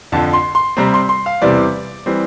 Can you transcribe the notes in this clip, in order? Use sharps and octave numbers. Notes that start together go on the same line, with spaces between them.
F2 D3 F3 A5
C6
C6
C3 G3 C4 A#5
C6
C6
F5
E2 C3 E3 G3 C4 D5
E3 G3 C4